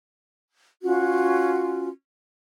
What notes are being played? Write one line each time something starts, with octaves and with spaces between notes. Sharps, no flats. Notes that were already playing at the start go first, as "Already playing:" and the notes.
C#4 F4 F#4